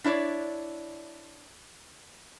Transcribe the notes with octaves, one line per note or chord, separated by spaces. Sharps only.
D4 E4 C#5 D5